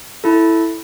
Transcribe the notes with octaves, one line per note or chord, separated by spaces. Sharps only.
E4 A4